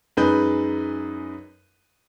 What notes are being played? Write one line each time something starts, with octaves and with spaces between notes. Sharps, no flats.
F#2 G#3 D#4 B4 G6